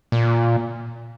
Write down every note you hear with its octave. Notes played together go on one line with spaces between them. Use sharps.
A#2